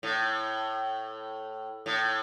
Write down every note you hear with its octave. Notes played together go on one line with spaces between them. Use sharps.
A2
A2